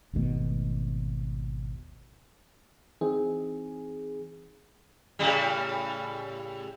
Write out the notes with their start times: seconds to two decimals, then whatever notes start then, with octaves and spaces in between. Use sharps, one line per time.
0.13 G#1 D#2 B2 A3
3.01 E3 C4 D#4 G#4
5.19 A2 C#3 G3